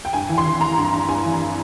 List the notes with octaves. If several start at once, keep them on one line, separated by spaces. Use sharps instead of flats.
G5
G2 G#5
E3
C6
E3
E3 A#5
G2
A#5
G2
G2 G#5
E3